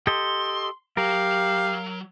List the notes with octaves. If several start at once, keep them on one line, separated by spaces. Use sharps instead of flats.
G4 A4 D#5 C6
F#3 G4 A#4 F5